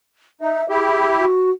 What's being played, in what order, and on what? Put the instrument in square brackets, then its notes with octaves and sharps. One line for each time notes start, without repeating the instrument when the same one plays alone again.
[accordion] D#4 [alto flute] E5
[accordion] E4 G4 [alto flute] G#4
[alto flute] F#4